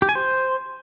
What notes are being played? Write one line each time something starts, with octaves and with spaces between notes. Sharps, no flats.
G4
G#5
C5